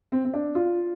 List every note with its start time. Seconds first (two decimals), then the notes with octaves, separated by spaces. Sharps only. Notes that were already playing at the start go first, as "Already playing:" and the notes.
0.12 C4
0.25 C4
0.34 D4
0.55 F4